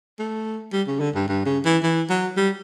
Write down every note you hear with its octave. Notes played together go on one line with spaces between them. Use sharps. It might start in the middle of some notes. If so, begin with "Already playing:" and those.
A3
G3
C#3
D3
G2
G2
C#3
E3
E3
F#3
G3